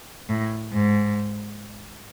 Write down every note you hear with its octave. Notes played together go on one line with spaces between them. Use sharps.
A2
G#2